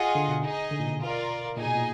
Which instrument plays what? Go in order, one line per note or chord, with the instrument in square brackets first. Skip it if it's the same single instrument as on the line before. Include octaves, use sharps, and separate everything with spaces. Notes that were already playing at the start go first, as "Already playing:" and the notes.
Already playing: [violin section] F4 G#4 D#5 F#5
[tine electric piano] D3
B2
[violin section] D#4 G#4 D#5
[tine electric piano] D3
A#2
B2
[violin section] F4 A#4 D5
[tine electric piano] A#2 [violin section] D#4 G#4 D#5 G#5
[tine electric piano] B2
A#2